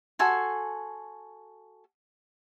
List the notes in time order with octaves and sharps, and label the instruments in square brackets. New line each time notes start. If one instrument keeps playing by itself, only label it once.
[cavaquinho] F#4 A4 G#5 C6